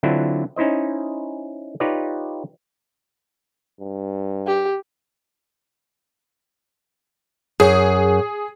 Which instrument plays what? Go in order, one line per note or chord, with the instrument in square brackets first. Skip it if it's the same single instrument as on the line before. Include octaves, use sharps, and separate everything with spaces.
[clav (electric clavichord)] D3 F#3 C4 D4 E4 F4
C#4 D#4 E4 C5 D#5
D#4 F4 G4 B4 C#5 D5
[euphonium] G2
[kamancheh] G4
[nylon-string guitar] F#2 [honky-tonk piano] G#4